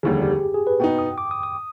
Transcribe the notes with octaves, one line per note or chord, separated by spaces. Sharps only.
F1 D#2 D3 G3 G#4
G4
G#4
B4
B2 B3 D#4 G5
D#6
D6
D#6
D#6